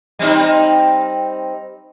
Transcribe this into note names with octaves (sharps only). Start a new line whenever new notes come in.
G3 C4 D#4